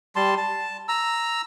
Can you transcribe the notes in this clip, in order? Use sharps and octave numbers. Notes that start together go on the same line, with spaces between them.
G3 A5 C6
A5
A#5 E6